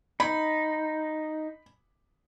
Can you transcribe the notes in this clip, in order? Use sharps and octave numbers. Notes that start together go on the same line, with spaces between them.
D#4 B5